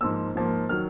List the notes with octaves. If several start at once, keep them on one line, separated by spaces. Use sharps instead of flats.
G#2 F3 A#3 E6
G#2 F3 A#3
D#3 F#3 F6